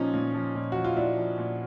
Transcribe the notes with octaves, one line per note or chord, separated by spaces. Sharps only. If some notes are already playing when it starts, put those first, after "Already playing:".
Already playing: A#2 F3 C#4 D#4
A#2
F3
A#2
F3 F#4
F4
A#2 D4 E4
F3
A#2